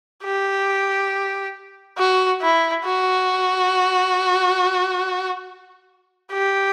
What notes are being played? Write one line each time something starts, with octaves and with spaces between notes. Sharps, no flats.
G4
F#4
E4
F#4
G4